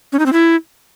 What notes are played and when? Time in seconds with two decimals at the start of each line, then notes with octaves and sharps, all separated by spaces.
0.12 C#4
0.19 D#4
0.26 C4
0.33 E4